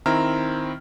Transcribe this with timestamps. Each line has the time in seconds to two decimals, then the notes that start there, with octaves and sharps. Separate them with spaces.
0.06 D#3 C4 E4 A#5 F6